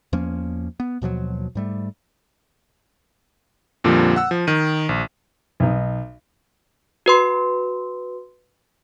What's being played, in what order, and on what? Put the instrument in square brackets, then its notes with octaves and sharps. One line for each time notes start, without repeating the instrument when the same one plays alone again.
[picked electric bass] E2 F3 A#3 C#4
B3
D#2 B2 F3 F#3
G#2 G3 A3
[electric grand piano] F2 A#2 D3 F3 G3 A#3
F#5 E6
F3
D#3 D#7
A#1
[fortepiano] B1 D#4
[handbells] F#4 B4 C6